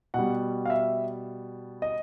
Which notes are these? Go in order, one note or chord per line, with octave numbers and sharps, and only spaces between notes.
B2 G3 F#5
F5
E5
D#5